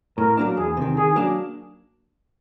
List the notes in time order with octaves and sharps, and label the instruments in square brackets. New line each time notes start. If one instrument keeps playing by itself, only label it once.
[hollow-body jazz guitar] A2 [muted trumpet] A#4
[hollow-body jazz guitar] F#3 A#3 D4
[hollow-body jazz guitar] E2 [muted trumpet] G#4
[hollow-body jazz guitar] C3 D#3
[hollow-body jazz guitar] D#3 [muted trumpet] G#4
[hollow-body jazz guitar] F#3 A#3 D4